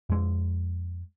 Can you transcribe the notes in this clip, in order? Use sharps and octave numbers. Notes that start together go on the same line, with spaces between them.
F2 G#3